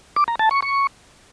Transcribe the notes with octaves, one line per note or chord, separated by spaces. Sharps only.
D6
A#5
A5
C#6
C#6